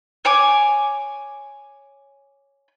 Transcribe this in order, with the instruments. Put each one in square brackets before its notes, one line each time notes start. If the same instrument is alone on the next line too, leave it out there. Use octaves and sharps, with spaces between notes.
[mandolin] C#5 G#5 D6